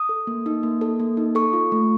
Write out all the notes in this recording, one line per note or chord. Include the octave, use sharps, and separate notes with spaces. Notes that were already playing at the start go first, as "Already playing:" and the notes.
Already playing: D#6
A4
A#3
D#4
A#3
A4
A#3
D#4
A4 C#6
F4
A3